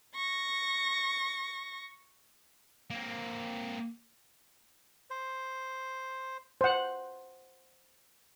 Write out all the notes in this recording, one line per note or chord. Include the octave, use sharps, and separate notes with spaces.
C#6 A#6
A#3 C4
C5
C5 F#5